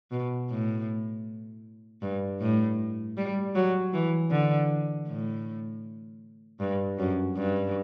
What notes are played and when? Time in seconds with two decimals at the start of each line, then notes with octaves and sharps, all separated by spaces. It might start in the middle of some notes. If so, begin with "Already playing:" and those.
0.11 B2
0.50 A2
2.02 G2
2.41 A2
3.17 G3
3.55 F#3
3.93 E3
4.31 D3
5.08 A2
6.60 G2
6.99 F#2
7.37 G2